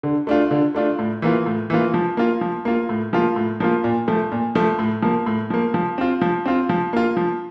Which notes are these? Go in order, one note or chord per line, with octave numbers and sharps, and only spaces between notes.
D3
A3 D4 F4
D3
A3 D4 F4
A2
E3 A#3 F4
A2
E3 A#3 F4
F3
A#3 F4
F3
A#3 F4
A2
F3 A#3 F4
A2
F3 A#3 F4
A#2
F3 A3
A#2
F3 A3
A2
F3 A#3
A2
F3 A#3
F3
C4 F4
F3
C4 F4
F3
A#3 F4
F3